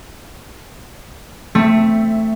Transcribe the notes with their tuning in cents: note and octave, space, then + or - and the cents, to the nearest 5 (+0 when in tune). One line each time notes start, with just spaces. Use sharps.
A3 +10 C4 +0 E5 +0